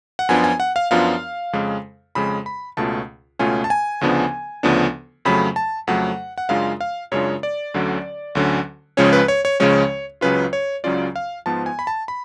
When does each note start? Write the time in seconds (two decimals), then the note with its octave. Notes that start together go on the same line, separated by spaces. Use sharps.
0.19 F#5
0.29 F#2 F3 B3 D4 F4 G#5
0.44 G#5
0.60 F#5
0.76 F5
0.91 F#2 F3 B3 D4 F4 F5
1.53 F2 C#3 G#3
2.15 F2 C#3 G#3 B5
2.46 B5
2.77 C#2 B2 A3 C#4 F4 A5
3.39 C#2 B2 A3 C#4 F4 G#5
3.64 A5
3.70 G#5
4.01 D2 C#3 F3 B3 D4
4.63 D2 C#3 F3 B3 D4
5.25 F2 C#3 F#3 A3 B5
5.56 A5
5.87 F2 C#3 F#3 A3 F#5
6.38 F#5
6.49 F#2 C#3 G#3 D4 F4 F5
6.81 F5
7.12 F#2 C#3 G#3 D4 F4 C#5
7.43 D5
7.74 D2 D3 F#3 C#4
8.35 D2 D3 F#3 C#4
8.97 C#2 C#3 F3 G#3 C#4 C#5
9.13 B4
9.28 C#5
9.45 C#5
9.60 C#2 C#3 F3 G#3 C#4 C#5
10.21 C#2 C#3 F#3 C#4 F4 B4
10.53 C#5
10.84 C#2 C#3 F#3 C#4 F4 D5
11.16 F5
11.46 G#2 F3 B3 A5
11.66 G#5
11.79 B5
11.87 A5
12.08 B5